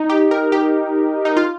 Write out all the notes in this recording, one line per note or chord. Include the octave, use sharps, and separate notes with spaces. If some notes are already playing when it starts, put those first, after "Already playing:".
Already playing: D#4
G4
A#4
G4
D#4
F4